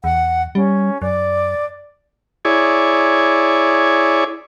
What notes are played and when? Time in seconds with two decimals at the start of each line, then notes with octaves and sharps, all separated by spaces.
0.04 E2 F#5
0.55 G3 C#4
1.02 F#2 D5
2.45 E4 G#4 C#5 D5